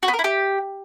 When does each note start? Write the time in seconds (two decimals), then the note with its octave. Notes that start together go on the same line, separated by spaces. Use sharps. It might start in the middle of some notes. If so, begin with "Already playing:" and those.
0.03 F#4
0.08 B3
0.13 A#4
0.19 E4
0.24 G4